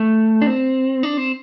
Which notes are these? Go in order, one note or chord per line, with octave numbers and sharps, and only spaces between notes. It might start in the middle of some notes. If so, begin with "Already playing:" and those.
Already playing: A3
D4
C4
D4
C4